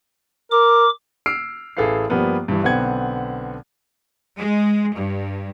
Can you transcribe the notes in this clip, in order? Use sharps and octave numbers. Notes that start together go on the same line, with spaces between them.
A#4 D6
E6 F6 C7 D7
A1 G#4 A4 B4 F5 C7
G2 F3 G3 A#3 B3
G2 E3
B1 D3 B3 C4 F#5 G#6
G#3
G2